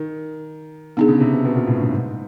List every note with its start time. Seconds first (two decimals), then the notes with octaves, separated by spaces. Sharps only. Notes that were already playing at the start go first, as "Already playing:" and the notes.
Already playing: D#3
0.97 D3 B3 D#4 G#4
1.08 C#3
1.20 C3
1.32 B2
1.45 B2
1.55 A#2
1.67 A2
1.80 G2
1.91 G#2